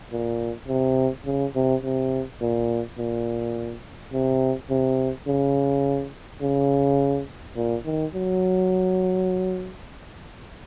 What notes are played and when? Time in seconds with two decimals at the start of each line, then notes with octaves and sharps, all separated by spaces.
0.12 A#2
0.68 C3
1.25 C#3
1.55 C3
1.83 C3
2.41 A#2
2.98 A#2
4.13 C3
4.70 C3
5.27 C#3
6.42 C#3
7.56 A#2
7.85 D#3
8.14 F#3